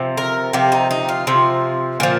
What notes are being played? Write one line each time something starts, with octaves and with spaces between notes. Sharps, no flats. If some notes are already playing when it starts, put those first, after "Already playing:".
Already playing: C3 F3
A#4
C3 F3 G4
D#4
D#4
F4
C3 F3
A#2 F3